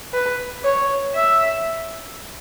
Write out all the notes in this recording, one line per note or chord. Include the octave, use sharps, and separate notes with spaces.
B4
C#5
E5